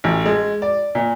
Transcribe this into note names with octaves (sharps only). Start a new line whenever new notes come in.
A1
G#3
D5
A#2